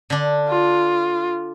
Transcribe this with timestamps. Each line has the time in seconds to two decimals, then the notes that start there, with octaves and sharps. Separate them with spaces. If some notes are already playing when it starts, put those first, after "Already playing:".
0.10 D3 D4
0.48 F4